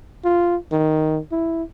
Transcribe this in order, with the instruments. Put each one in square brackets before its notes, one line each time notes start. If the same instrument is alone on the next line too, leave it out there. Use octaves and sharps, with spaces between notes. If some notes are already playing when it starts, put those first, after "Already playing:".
[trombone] F4
D#3
E4